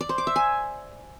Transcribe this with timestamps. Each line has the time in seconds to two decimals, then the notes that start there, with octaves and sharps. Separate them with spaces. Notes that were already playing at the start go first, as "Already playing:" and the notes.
0.01 D5
0.09 C5
0.18 D6
0.27 E5
0.36 G#5